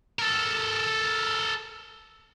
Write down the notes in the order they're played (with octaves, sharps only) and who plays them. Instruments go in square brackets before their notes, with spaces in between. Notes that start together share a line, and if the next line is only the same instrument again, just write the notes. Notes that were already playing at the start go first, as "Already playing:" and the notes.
[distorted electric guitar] A4 A#4